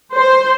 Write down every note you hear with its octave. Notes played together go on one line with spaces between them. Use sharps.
C5